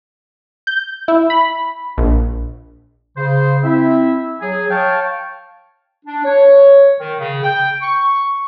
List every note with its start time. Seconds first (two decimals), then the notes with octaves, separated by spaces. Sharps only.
0.67 G6
1.08 E4
1.30 B5
1.98 A#1
3.17 C#3 C5
3.64 C4 E4 E5
4.41 F#3 G#4
4.70 C#5 F5 G5 A5
6.05 D4
6.24 C#5
6.99 D#3
7.19 C#3
7.43 G5
7.81 C#6